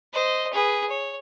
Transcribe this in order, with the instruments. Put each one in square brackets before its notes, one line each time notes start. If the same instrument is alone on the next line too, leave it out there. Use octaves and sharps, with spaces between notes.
[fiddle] C5 D#5
G#4 B4
C#5